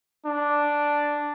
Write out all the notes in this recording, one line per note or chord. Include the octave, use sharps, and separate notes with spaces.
D4